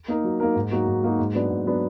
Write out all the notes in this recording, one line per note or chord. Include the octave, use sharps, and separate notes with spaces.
A#3 D#4 A#4
F#3
A#3 D#4 A#4
G#2
F#3 A#3 D#4 F#4
G#2
F#3 A#3 D#4 F#4
G#2
F#3 B3 D4
G#2
F#3 B3 D4